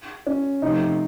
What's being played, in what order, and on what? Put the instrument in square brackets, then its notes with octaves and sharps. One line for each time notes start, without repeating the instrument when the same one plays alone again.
[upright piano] C#4
[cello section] C3 F3 A3 [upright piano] D#4